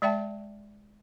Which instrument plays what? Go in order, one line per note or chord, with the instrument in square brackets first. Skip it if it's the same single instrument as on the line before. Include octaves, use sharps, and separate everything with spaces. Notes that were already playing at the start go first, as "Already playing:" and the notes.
[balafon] G#3 D5 E5 G5 A5